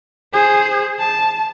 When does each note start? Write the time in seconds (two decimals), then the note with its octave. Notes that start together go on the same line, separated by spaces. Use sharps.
0.33 G#4 C5
0.99 A5